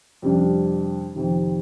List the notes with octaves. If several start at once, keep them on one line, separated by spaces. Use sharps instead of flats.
F2 C3 G3 D4
F2 C3 D#3